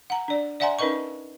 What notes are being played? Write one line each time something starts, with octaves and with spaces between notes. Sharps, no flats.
F#5 A#5
D4 D5
D5 E5 F#5 G#5 A#5 C6
C#4 D#4 A#4 B4 D#5 C#6